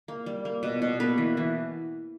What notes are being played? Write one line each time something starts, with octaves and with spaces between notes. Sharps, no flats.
A#3
G3
A#3
B2
B2
A#3 B4
E3
E3